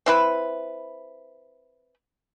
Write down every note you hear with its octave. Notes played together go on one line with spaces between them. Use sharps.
C4 E4 B4